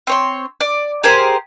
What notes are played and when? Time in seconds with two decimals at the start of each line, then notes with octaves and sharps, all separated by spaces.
0.07 C4 C#5 C6
0.61 D5
1.03 G4 G#4 A#4 C5